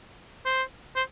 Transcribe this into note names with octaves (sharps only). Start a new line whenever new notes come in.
C5
C5